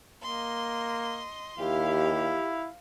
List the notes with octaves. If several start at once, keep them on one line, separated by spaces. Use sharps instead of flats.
A#3 D#5 C6
D#2 E4 G4 F5